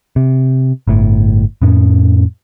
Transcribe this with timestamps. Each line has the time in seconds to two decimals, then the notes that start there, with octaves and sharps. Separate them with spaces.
0.16 C3
0.87 G1 A2
1.62 F2 A2 C#4